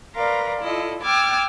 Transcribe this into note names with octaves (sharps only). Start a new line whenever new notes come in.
A#4 B4 D5 F5 A#5 C6
E4 F4 A4 D5 D#5
G5 D6 E6 F6 G#6 A6